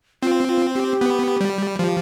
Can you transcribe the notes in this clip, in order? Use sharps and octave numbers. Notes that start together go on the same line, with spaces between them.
C4 F4
F4
G4
B3
G3
F3 G4